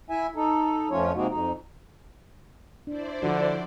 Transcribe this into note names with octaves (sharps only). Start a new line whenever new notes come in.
E4 E5 G#5
D#4 A4
F2 F3 A3 C#4 F4 C#5
C3 G#3 A#3 C4 D#4 F#4
F2 D#4
D4 E4 C5 D5
D3 F3 D4 F#4